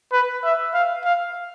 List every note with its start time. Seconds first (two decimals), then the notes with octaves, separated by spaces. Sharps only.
0.12 B4
0.44 E5
0.74 F5
1.04 F5